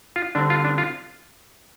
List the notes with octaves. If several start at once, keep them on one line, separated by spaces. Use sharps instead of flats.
F4
D3 G3 C4 D4
F4
D4
F4